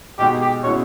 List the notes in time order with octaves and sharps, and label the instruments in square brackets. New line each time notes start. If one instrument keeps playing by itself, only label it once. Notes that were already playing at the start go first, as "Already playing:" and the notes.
[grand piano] B2 G#3 D#4 [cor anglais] G4
[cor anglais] G4
[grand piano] B2 G#3 C#4 E4 [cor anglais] C#5